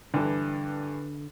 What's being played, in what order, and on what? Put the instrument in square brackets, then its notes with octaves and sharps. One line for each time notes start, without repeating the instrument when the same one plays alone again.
[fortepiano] G2 E3 A4 [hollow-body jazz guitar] D3